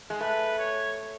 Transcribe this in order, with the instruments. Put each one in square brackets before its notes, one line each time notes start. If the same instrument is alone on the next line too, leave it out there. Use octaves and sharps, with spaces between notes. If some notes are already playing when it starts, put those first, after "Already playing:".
[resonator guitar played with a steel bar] G#3
[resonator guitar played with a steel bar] A3 [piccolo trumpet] B4
[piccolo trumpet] C#5